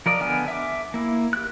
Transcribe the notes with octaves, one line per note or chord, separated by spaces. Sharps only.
F3 A#4 D5 D#5
D3 B3 D#5 G#5 F6
E5 D6
A#3 E4
G4 F#6